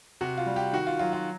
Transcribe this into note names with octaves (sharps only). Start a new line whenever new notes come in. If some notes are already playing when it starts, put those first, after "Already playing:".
C3 F#4
F4
G3
G4
D#3 F#4
F4
F#3 F4
F4